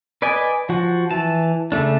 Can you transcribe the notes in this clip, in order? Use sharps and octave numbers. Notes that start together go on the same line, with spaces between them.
B4 D5 D#5 G#5
F3 F#4
E3 A5
C#3 A3 D4